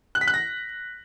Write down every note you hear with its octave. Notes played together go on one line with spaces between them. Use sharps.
F#6
B6
F#6
A#6